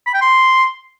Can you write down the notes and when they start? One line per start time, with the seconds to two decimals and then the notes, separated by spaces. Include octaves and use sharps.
0.06 B5
0.14 G5
0.21 C6